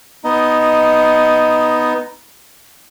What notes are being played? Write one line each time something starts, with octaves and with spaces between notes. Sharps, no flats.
B3 D#4 D#5